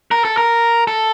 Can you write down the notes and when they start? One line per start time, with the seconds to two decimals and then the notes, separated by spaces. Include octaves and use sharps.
0.11 A#4
0.25 A4
0.37 A#4
0.87 A4